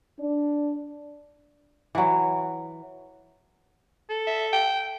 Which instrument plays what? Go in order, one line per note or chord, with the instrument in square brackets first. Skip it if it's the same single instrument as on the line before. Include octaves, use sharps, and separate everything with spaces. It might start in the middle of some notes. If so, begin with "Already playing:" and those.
[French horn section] D4
[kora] E3 F#3
[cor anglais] A4
[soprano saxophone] E5
G5